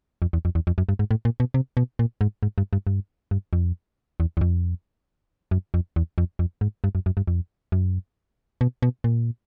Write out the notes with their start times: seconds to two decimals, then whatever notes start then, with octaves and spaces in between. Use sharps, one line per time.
0.22 F2
0.33 E2
0.45 F2
0.55 E2
0.67 F2
0.78 F#2
0.89 G2
0.99 G#2
1.11 A2
1.25 A#2
1.40 B2
1.54 C3
1.77 B2
1.99 A#2
2.21 G#2
2.43 G#2
2.58 G2
2.73 G2
2.87 G2
3.31 G2
3.53 F2
4.20 E2
4.37 E2
4.41 F2
5.51 F#2
5.74 F2
5.96 E2
6.18 F2
6.39 F2
6.61 G#2
6.84 G2
6.95 F#2
7.06 F#2
7.17 G2
7.27 F2
7.72 F#2
8.61 B2
8.82 B2
9.04 A#2